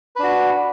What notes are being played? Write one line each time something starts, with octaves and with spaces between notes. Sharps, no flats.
D4 F#4 B4